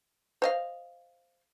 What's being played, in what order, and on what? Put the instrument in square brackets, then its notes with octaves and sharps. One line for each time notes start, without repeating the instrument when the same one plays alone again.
[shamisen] C5 D#5 F5